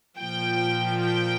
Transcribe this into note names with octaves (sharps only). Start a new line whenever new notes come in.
A#2 F3 G5
G5